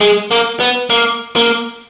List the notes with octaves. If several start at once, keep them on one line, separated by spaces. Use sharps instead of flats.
G#3
A#3
B3
A#3
A#3